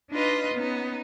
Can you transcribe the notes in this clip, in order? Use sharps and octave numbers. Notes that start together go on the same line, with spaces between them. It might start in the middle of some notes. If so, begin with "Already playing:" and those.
D4 D#4 F4 B4 D#5
B3 C#4 D#4